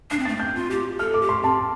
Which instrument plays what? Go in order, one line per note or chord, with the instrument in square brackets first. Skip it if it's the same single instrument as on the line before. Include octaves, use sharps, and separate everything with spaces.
[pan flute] D4 [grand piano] C7
[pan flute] C4
[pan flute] A3 [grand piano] A6
[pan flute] C4 [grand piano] G6
[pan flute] F4
G4
[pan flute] A4 [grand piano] F6
[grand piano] D6
[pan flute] G4
[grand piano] C6
[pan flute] C4 [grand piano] A5